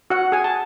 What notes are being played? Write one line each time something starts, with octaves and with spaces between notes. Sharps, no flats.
F#4 F#5
G#4 G#5
A5